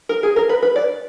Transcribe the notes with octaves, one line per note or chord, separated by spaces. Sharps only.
A#4
G#4
A#4
B4
B4
D5